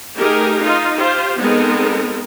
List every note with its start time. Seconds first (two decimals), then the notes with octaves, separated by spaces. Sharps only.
0.16 A3 D#4 G4 G#4 A#4
0.60 D#4 F4
0.98 F4 G4 C5
1.39 G#3 B3 C4 D#4 A4 A#4